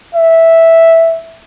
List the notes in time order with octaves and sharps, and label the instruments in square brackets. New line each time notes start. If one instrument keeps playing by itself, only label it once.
[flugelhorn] E5